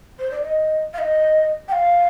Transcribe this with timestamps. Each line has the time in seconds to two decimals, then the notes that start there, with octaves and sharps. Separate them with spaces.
0.19 C5
0.31 D5
0.43 D#5
0.93 F5
0.98 D#5
1.68 G5
1.72 F5